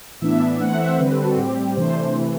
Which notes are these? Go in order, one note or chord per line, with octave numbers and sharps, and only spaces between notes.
A2 E3 B3 D4 E5
E3 A3 C4 F#5
E5
C5
D3 G3 C4 B4
A4
F#4
A2 G3 C4 G4
C3 E3 A3 D4 C5
C3 E3 A3